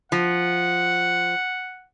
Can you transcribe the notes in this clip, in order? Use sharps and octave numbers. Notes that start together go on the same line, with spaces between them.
F3 F#5